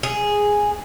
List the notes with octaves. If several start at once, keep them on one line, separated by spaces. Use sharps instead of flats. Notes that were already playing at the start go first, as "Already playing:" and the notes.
G#4